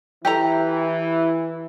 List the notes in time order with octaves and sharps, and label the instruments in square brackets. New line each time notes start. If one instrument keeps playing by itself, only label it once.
[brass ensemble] E3 [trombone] E4 [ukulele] G4 A4 A#5